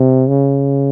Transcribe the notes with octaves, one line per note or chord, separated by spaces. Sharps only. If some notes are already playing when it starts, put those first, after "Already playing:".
Already playing: C3
C#3